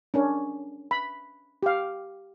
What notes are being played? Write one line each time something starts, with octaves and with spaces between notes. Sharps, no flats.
C#4 D4 A#4
B5
G4 F5